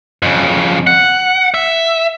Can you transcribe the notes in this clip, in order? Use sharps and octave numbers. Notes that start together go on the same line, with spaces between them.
F2 C#3
F#5
E5